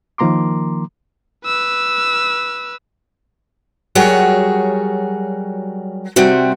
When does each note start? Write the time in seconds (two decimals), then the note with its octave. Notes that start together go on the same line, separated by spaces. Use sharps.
0.18 D#3 F3 A#3 A#5 C6 D6
1.46 B4 E6
3.95 F#3 G3 F#4 G#4 A#4 C#5
6.16 C3 G3 C4 F#4